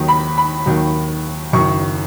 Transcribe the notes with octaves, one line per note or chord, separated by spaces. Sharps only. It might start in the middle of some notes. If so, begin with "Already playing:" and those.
Already playing: D#2 D#3 F#3
B5
B5
D#2 D#3 F#3
F#1 F#2 D#3 C#6